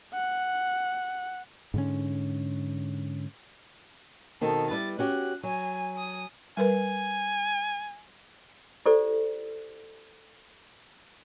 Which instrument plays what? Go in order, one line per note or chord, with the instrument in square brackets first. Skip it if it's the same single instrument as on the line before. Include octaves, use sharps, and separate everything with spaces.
[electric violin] F#5
[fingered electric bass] G#2 D3 C#4
[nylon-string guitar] B2 D#3 C4 [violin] A4
[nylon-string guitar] G3 E4 B4 [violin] A6
[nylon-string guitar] C#4 F#4 G4 [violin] F#6
[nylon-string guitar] F#3 [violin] G#5
[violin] G#5 D#6
[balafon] G3 A#4 B4 [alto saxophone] G#5
[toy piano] E4 G4 A4 C5 D5